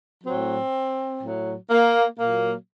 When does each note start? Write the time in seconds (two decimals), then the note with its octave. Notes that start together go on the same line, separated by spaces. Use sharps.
0.24 A2 F#3 C4
1.21 A2 F#3
1.70 A#3
2.18 A#2 F#3 A#3